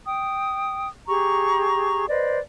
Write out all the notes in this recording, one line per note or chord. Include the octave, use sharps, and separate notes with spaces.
G5 D#6
G4 G#4 A#5 C#6
B4 C5 D5 D#5